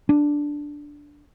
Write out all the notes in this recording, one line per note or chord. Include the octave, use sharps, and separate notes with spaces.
D4